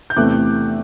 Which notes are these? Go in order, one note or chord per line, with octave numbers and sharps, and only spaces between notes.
G6
E2 C3 E3 A3 C4 D6 F#6